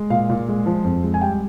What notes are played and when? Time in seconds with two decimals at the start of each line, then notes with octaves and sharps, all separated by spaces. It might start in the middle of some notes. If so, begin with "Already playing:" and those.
Already playing: G#3
0.10 A#2 F5
0.29 A#2
0.48 G#3
0.66 F3
0.84 F2
1.03 G#3
1.14 G#5
1.21 G3 G5